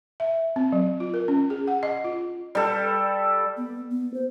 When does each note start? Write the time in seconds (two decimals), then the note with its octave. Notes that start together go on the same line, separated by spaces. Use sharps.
0.20 E5
0.56 C4
0.72 F#3
1.00 F4
1.14 A#4
1.28 C#4
1.50 G#4
1.67 F#5
1.83 D#5
2.04 F4
2.55 G3 A4
3.57 B3
3.91 B3
4.14 C5